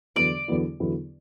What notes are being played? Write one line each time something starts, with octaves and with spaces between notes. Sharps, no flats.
E2 D3 F#3 B3 E4 D5
E2 D3 F#3 B3 E4
E2 D3 F#3 B3 E4